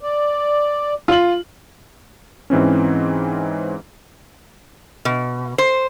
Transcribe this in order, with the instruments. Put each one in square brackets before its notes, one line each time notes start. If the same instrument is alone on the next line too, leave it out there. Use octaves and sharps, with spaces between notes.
[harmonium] D5
[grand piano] F4 F#7
[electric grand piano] G#2 E3 C4 C#4
[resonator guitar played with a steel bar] B2
C5